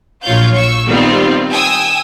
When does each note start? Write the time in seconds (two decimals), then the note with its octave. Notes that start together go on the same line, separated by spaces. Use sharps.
0.24 A#1 F#3 F4 C#5 F5 G6
0.54 C#6 E6
0.87 D#3 G3 B3 C4 F4
1.52 G5 G#5 D#6 E6